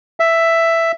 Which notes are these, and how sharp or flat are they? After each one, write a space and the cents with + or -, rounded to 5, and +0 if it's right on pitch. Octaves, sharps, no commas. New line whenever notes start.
E5 +5